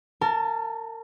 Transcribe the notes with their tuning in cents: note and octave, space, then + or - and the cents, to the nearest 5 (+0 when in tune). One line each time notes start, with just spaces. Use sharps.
A#4 -30 A5 +0